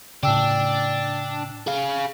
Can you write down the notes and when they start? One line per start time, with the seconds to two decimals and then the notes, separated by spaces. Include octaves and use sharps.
0.23 A2 C#3 D4 G5 E6
1.67 G#4 F5